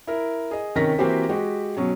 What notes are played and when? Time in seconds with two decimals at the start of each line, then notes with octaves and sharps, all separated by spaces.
0.07 E4 A#4
0.51 G#4 D#5
0.75 C3 D#3 C#4 A#4 A#6 B6
0.98 E3 A#3 C4 F#4 G4 C5
1.29 G#3 F#4 G4
1.77 B2 F#3 C#4